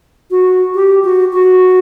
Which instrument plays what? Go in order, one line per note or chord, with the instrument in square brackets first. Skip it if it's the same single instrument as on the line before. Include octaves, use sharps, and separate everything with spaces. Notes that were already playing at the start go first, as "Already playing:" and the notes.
[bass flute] F#4
G4
F#4
F#4